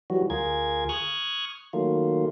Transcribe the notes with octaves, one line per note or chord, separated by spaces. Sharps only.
E3 F#3 G3 F#4
D2 F4 G#4 A#4 G#6
C#6 D#6 F6 F#6 G#6
D#3 F#3 A3 A#3 F4